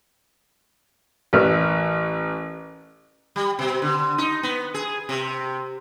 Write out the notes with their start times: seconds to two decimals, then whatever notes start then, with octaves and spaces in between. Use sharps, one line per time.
1.33 A1 A#4 B4 E5 F6
3.36 G3
3.59 B2
3.82 D3
4.18 D#4
4.43 B3
4.74 G#4
5.09 C3